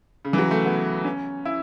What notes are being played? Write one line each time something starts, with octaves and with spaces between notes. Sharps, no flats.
C#3
E3
F#3
A3
B3
C#4
E4